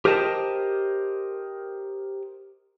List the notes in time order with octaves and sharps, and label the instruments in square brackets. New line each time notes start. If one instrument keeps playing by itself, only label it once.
[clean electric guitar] G4 A#4 C5 D#5 G5 A5